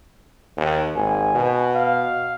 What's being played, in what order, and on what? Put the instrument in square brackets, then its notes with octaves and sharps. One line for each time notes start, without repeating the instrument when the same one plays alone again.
[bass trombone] D#2
[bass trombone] G#1 [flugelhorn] G#5
[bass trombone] B2
[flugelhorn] F5